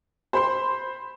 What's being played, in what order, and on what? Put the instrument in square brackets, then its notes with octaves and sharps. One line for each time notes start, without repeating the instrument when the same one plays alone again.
[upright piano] C5 B5 C6